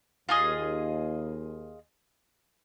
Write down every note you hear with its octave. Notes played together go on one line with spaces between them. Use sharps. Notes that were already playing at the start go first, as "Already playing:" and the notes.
D#2 F4 G#4 D#5